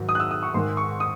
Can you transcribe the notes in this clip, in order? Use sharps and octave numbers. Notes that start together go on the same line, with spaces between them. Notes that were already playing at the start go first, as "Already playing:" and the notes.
Already playing: G#2 D#3 F#3
D#6
F#6
E6
D#6
C#6
G#2 D#3 G#3 C6
C#6
D#6